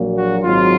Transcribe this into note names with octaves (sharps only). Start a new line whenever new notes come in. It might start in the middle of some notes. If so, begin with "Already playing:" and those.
Already playing: A#1 A#2 F#3 A#3
F#4
G#1 G#2 F#3 F4